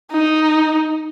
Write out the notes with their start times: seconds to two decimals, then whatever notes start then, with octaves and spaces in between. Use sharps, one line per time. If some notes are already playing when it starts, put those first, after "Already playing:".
0.12 D#4